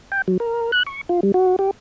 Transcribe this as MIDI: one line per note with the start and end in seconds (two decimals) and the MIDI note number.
0.12 0.22 79
0.28 0.37 54
0.40 0.71 70
0.72 0.83 90
0.87 1.01 85
1.09 1.20 65
1.23 1.32 55
1.34 1.56 66
1.59 1.71 67